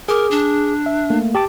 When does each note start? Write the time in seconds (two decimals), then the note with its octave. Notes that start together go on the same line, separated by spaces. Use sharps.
0.09 G#4 A#4 D6
0.31 D4
0.86 E5
1.10 A3 A#3
1.35 G4 A5 D6